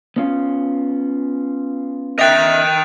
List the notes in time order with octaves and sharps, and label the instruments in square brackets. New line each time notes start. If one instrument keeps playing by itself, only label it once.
[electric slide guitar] B3 C#4 F4
[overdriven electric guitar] D#5 G5 [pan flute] E5 [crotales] F#6 A6 F7